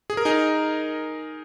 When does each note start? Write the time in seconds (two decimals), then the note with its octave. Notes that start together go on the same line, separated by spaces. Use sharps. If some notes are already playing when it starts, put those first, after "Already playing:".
0.10 G#4
0.17 A#4
0.25 D#4 G#4